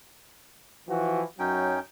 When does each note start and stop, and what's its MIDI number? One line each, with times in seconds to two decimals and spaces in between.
0.88 1.22 52
0.88 1.22 53
0.88 1.22 66
1.39 1.76 42
1.39 1.76 54
1.39 1.80 61
1.39 1.80 63
1.39 1.80 79